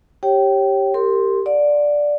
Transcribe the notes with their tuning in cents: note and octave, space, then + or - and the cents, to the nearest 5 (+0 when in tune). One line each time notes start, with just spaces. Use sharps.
G4 +0 C#5 -20 G5 -20
G4 +0 A#4 -30 C6 +0
D5 +0 F#5 -25